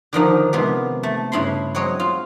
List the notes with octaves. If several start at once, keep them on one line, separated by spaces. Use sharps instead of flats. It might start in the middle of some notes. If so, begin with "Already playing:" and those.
D3 D#3 F3 D#4
C3 D#3 F3 G#3 B3
A3
G2 C#3 E4 B5 C6
F#3 G#3 C4 C#5 D#5
F4